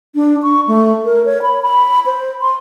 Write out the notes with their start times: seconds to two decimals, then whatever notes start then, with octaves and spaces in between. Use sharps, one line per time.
0.15 D4
0.43 C#6
0.68 A3
1.05 A#4
1.26 C#5
1.42 B5
1.62 B5
2.06 C5
2.41 C6